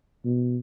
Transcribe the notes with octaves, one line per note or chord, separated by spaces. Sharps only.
B2